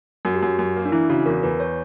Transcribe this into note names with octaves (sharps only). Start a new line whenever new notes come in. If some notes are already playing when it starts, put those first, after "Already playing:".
F#2 F#4
G4
F#2 F#4
F#2
A#3
D4
E3 E4
C#3 F#4
E2 A#4
E2 B4
C#5